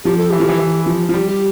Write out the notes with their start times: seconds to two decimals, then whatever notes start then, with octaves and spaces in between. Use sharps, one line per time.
0.04 F3 G4
0.17 A4
0.30 E3 G4
0.40 F3
0.49 E3
0.59 E3
0.86 F3
1.09 F3
1.14 G3
1.27 G4